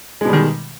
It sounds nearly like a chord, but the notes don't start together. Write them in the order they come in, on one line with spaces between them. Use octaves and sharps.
G#3 B2 G3 D#3